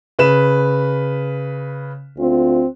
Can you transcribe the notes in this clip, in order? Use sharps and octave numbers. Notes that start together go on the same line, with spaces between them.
C#3 B4 E7
D2 C4 F4